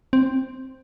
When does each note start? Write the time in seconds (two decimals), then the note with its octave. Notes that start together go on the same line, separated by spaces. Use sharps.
0.13 C4